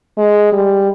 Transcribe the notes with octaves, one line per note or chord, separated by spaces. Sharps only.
G#3
G3